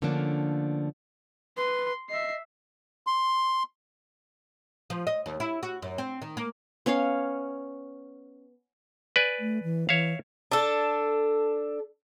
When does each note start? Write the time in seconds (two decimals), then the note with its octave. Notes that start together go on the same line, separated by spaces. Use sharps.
0.02 D3 F3 A3 A#3 C#4 D4
1.57 B4 C6
2.10 D#5 E5 C7
3.07 C6
4.90 F3
5.07 D#5
5.26 D#2
5.40 E4
5.63 F#4
5.82 F#2
5.98 C4
6.22 D#3
6.37 A#3
6.86 B3 C#4 C#5 F5
9.16 B4 D5 G#5
9.39 A3
9.63 E3
9.89 E3 C#5 E5 F5
10.52 D4 A4